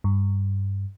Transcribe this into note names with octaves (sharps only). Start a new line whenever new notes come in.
G2